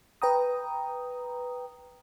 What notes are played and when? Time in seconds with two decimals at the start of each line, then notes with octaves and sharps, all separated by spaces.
0.22 B4 G5 A#5 D#6